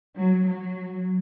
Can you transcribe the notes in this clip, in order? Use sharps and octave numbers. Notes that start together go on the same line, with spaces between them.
F#3
F#3